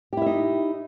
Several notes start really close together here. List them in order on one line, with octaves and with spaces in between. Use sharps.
G4 E4 E5 D#4